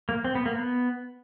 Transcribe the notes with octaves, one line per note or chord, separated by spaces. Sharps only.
A#3
C4
B3
A#3
B3